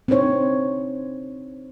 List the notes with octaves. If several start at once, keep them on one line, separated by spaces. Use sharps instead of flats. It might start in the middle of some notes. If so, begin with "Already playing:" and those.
C4 D4 D#4 C5 C#5